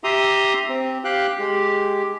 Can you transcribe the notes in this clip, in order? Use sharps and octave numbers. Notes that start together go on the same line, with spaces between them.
G4 E5 A#5 C6 D#6
C4
G4 F5 G5 F#6
G#3 G4